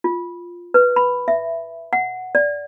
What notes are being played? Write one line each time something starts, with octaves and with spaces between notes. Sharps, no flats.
F4
B4
B5
E5
F#5
D5